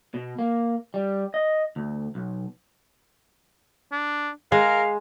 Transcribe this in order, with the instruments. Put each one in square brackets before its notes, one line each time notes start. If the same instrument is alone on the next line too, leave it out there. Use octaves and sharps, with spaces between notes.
[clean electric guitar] B2
A#3
G3
D#5
D2
B1
[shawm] D4
[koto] G#3 [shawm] A#4 [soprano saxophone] F5